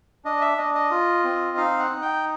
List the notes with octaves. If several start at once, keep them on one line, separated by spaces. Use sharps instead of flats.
D4 D#5
E5
D4 D#5
D#5
F4
C4
D#4 F5
F#5
D#4
G5